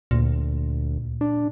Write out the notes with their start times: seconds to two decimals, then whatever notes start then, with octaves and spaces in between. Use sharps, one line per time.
0.11 D2 A#2
1.21 D4